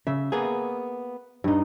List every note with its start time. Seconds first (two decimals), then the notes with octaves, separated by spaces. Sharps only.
0.07 C#3 E5
0.32 A#3 B3 G#4
1.44 G2 D#4